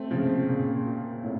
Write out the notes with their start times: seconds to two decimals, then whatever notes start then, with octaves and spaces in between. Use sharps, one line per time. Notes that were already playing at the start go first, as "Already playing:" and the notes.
Already playing: A3 C4
0.11 C#3 F3
0.49 A#2 C#3
0.86 A#2
1.24 A2 C3